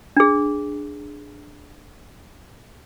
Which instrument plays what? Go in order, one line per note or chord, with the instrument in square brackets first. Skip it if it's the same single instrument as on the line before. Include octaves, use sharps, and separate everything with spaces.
[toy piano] D4 G#4